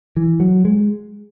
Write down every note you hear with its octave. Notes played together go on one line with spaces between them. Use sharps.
E3
F#3
G#3